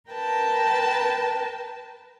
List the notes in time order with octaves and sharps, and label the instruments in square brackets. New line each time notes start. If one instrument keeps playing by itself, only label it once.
[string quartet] A#4 B4 G5 A5